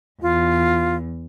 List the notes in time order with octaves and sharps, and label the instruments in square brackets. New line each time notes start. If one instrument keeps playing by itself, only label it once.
[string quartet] E2 [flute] F4